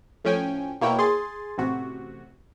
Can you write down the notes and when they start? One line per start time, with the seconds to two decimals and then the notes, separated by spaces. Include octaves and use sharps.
0.24 A2 F3 C#4 G5 G#5
0.81 B2 A#3 E4 C#5 G5
0.99 G#4 C6 A6
1.58 A1 C3 F#4